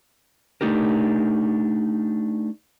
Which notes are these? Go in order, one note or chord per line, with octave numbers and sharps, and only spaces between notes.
A3 D4 D#4 G4 A#4